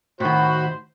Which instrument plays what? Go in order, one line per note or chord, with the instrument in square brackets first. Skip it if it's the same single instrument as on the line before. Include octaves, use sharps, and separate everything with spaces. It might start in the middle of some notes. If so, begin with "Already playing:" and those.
[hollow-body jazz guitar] A2 D#3 [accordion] F#4 B5 [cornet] C5